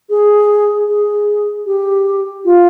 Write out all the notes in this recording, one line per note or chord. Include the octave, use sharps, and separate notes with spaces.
G#4
G#4
G4
F4